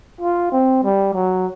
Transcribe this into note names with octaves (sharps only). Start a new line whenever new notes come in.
F4
C4
G3
F#3